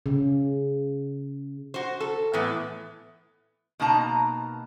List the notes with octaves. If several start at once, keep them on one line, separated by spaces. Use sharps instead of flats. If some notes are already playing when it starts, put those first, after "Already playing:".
C#3
F#4 C5
A4
A2 E3 B3
B2 A#3 D#4 A5 A#5